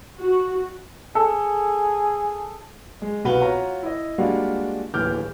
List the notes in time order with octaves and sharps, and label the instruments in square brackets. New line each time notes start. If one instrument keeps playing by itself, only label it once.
[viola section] F#4
[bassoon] G#4 [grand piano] A4
[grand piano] G#3
C2 B2 F#4 B4 F5 G7
F4 F#4 C#5 A#5
E4 D#5
G3 G#3 A#3 D4 F4 F#4
D1 D#2 E3 D6 F6 G6